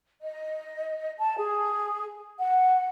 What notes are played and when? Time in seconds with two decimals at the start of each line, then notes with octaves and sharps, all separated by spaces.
0.21 D#5
1.18 A5
1.37 G#4
2.39 F#5